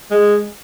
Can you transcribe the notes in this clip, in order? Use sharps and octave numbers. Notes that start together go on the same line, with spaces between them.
G#3